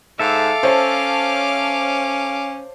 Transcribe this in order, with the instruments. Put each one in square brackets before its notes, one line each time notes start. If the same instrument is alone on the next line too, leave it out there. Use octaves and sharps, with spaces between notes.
[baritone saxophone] G#2 [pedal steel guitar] A4 E5 [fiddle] F5 D6
[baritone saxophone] C#4 [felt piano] C5 C#5 A5